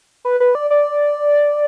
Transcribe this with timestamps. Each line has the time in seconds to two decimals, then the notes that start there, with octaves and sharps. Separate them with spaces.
0.25 B4
0.40 B4
0.55 D5
0.70 D5